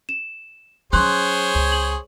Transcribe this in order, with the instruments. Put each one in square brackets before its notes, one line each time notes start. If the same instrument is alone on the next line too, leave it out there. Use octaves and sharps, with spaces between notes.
[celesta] E7
[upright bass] F#3 C#4 [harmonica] G#4 C5 C#5 [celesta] C6 F#6
[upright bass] C#2
[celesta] F#7